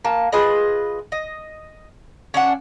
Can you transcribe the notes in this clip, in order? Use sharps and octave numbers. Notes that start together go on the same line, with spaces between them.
A#3 A5
F4 G#4 B4 D#5
D#5
C#4 D4 F#5